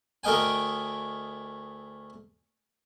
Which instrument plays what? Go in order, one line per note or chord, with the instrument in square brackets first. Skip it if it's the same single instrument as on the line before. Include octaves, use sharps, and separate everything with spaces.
[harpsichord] D2 A3 A#4 D#5 G5 G#5